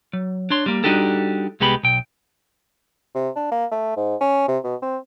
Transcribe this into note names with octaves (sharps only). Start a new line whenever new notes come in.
F#3
D4 C#5 C6
G3 A#3
G3 D4 D#4 F#4 G4 A4
C2 G#3 B3 G4 B5
B1 G5
C3
D4
A#3
A3
G#2
C#4
C3
B2
C4